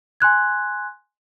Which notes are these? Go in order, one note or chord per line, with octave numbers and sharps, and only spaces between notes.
G#5 C6 F#6 G#6